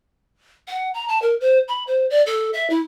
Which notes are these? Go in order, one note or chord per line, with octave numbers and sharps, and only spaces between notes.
F#5
A#5
A5
A#4
C5
B5
C5
D5
A4
E5
E4